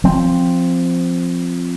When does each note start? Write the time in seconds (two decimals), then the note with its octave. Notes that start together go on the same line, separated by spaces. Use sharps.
0.04 F3 C4